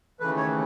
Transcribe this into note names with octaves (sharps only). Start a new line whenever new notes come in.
D#2 C#3 E3 A3 B4
C#5